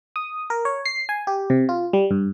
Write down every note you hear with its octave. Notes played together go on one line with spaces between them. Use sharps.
D#6
A#4
C#5
C7
G#5
G4
C3
F4
G3
G2